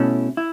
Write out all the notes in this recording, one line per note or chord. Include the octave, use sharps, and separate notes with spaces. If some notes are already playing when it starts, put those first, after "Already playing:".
Already playing: B2 A3 C#4 E4
E4